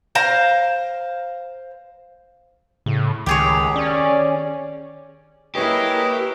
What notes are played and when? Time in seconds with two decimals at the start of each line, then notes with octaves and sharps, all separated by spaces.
0.15 C5 F5 A#5
2.86 A2 C#3
3.26 C#2 D#3 G4 G#4 C#5
3.76 C#4 D5
5.55 A#3 E4 G4 G#4 A#4 B4 C#5 D#5